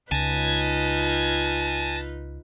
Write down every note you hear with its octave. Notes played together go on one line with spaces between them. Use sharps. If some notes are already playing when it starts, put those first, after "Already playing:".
C#2 D#4 F4 B4 G#5 A5 A#6